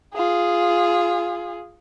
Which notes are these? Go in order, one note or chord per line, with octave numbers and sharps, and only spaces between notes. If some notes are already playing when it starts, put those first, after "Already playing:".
F4 G#4